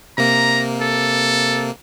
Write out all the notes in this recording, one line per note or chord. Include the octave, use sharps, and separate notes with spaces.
C3 A#3 A#5
A4